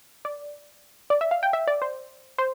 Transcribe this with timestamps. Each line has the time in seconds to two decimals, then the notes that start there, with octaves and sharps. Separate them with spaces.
0.25 D5
1.10 D5
1.21 E5
1.31 F5
1.43 G5
1.53 E5
1.67 D5
1.82 C5
2.38 C5